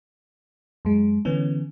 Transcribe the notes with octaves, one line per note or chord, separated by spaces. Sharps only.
F#2 G#3
D3 E3 B3 C#4